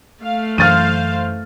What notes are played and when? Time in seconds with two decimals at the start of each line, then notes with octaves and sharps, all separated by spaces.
0.23 A3 F5
0.58 F#2 E3 C5 F5 F6 A6 D#7